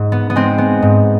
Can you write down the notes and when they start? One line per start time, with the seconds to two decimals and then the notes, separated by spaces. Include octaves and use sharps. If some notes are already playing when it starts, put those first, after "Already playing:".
Already playing: G#2
0.12 B3
0.30 B3
0.36 G#3 C4
0.58 B3
0.82 G#2